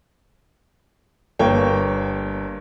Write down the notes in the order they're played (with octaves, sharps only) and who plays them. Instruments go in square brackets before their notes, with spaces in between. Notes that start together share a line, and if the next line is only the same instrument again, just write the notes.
[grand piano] G1 A#3 C#5 G5